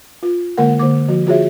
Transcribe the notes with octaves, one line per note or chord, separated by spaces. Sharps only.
F4
D3 G#3 A#3 A#4 F#5
D3 A#3 D6
F3 F#4
F4 F#4 G#4 C#5 E5